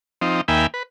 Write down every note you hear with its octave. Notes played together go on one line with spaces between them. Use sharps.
F3 C4 D#4
D#2 A#3 E5 G5 G#5 B5
B4